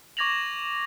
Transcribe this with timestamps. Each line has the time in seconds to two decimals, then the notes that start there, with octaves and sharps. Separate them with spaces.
0.17 C#6 D6 G#6 A#6 F7 F#7